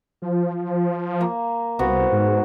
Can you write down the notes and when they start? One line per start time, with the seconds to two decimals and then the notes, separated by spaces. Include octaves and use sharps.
0.22 F3
1.21 A#3
1.79 C2 B3 F#4 C5
2.12 G#2